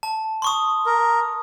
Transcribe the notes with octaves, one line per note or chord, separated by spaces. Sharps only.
A5
C6 C#6 D#6
A#4